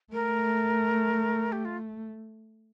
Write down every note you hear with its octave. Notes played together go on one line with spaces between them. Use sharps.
A3 A#4
G4
F4